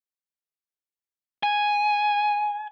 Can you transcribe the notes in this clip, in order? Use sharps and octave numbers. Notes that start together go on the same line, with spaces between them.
G#5